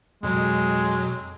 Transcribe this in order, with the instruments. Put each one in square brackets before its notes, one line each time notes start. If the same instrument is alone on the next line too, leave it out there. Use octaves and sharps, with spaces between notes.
[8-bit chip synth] F2 B2 F#3 [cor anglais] G#3